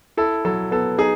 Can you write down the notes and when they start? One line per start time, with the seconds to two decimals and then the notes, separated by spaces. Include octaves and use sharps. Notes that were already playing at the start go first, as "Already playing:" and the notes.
0.17 E4 A4
0.45 F#3 A4
0.71 B3 A4
0.98 D#4 G#4